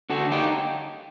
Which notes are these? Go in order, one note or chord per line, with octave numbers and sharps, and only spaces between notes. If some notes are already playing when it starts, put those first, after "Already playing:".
D3 F#4 A4
D#4 G4